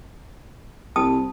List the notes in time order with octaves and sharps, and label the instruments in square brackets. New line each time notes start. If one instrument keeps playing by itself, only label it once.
[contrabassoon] C2 [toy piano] G5 A5 D#6